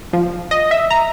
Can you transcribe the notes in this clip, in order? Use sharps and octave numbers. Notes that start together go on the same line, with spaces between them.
F3
D#5
E5
A#5